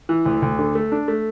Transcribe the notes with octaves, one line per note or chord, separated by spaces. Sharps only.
E3
D2
D2
D3
A3
D4
A3